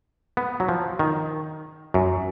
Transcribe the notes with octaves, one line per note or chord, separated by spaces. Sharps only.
B3
F#3
F3
D#3
F#2